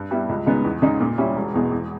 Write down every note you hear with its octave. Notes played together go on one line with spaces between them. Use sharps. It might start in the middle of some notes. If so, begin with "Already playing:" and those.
Already playing: G2
G3 B3 E4
C#2
C#3 G#3 B3 D#4
E2
C#3 G#3 D#4
A#2
G3 C#4 E4
E1
E2 B2 G#3
E2